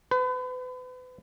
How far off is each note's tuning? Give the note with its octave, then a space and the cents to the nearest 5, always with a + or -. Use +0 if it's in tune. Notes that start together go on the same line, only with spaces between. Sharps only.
B4 +35